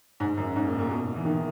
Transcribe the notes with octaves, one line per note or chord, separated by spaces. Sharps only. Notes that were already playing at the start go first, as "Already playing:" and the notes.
G#2
F#2
G#2
A#2
A#2
B2
E3
D#3